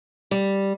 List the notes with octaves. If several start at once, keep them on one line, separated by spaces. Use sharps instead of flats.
G3